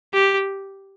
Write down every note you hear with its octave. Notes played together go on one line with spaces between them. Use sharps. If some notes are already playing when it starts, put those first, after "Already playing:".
G4